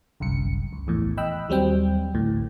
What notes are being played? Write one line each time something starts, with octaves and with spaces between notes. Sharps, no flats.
G1 C2 F#2 C#7
C#2
A#1 E2 A2
D#5 G5 B5 E6 F#6
D#2 F#3 G3 C4 G5
A1 D2 A2